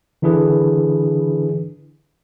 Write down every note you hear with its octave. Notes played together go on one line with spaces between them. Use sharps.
D3 E3 D4 E4 G#4 B4